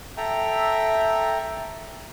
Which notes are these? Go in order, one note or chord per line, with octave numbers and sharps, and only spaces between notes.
A4 E5 G5 A#5